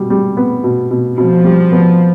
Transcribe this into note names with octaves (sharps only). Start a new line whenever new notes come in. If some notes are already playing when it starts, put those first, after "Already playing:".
Already playing: B2 G3
G3
B3
B2
B2
B2 F3
G3
B3